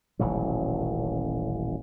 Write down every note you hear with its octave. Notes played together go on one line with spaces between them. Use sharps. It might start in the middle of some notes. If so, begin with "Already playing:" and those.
D#1 A1 B2 F#3